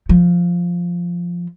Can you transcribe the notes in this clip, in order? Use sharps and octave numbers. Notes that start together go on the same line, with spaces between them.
F3